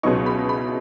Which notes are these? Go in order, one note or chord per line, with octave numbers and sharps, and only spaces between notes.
C#2 B2 F#3 B3 D#4 C#6
B5
B5